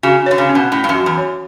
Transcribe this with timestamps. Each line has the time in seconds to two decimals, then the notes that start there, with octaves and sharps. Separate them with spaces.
0.03 C#3 F#4
0.26 D3 C#5
0.38 C#3
0.49 C#4
0.55 B2
0.72 A2 C#4
0.84 G2
0.89 F#2
0.95 F#4
1.06 E2
1.17 C#5